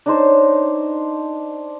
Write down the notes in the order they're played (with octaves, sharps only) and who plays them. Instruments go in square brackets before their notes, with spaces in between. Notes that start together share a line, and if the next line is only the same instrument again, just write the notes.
[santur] D4 D#4 C5 C#5